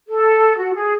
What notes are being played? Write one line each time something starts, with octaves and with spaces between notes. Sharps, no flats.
A4
F#4
G#4